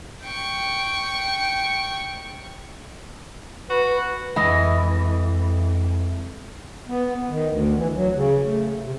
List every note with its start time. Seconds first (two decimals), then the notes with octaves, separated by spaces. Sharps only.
0.23 G5 C#6
3.70 F#4 B4
4.36 F2 E3 G#3 D#5
6.88 B3
7.29 D#3
7.49 D2
7.76 E3
7.94 F#3
8.16 C#3
8.44 A3
8.80 C3